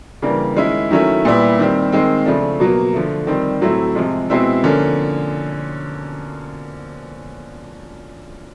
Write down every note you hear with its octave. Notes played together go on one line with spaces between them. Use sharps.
C#3 E3 G3 A#3 D4
D#3 G#3 C#4 E4
D#3 F#3 A3 C#4 E4
A#2 G3 B3 E4
D#3 G3 C4
D#3 G#3 C4
C#3 F3 A3 D4
B2 F#3 A#3
D3 F3 A3
D#3 G3 C4
A2 F#3 A3 C4 E4
C3 F3 G#3
B2 G#3 C4 E4
D3 F3 A#3 C#4